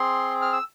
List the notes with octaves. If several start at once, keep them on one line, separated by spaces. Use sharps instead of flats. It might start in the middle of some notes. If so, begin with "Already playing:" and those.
Already playing: C4 G#4 C6
F6
E6